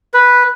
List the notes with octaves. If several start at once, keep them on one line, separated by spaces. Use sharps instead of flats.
B4